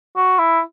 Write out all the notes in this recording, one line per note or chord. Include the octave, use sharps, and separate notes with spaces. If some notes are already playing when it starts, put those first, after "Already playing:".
F#4
E4